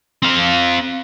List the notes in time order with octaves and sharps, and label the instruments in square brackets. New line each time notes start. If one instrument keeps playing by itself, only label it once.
[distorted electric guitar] C4 F5